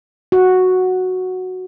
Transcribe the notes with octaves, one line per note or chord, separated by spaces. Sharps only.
F#4